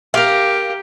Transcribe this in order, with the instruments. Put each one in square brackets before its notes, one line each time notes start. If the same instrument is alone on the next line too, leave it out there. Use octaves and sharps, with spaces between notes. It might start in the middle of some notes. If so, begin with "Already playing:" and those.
[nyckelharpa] G4 [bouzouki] A#4 F5